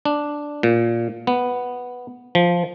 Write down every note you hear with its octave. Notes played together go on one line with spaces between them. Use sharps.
D4
A#2
B3
F3